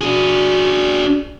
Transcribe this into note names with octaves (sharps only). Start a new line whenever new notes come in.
D4 F#4 G#4